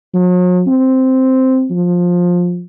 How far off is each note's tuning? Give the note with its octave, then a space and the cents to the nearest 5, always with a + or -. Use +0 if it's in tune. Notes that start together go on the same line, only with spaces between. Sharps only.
F#3 -45
C4 -5
F3 +20